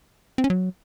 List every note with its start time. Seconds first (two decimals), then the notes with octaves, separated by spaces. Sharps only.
0.38 C4
0.44 C#4
0.50 F#3